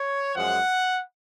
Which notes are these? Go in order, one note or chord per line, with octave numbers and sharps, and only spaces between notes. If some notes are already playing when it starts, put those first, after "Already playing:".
Already playing: C#5
F#2 F3 G#3 F#5